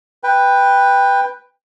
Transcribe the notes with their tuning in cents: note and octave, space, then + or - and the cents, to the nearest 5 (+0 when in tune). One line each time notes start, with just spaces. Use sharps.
B4 +0 G5 +15